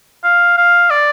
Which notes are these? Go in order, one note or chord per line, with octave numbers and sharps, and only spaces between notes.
F5
F5
D5